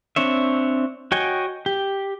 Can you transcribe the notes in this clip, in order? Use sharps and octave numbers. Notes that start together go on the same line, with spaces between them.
C4 D4 C#5 E5
F#4 C#5 D#5 G5 G#5
G4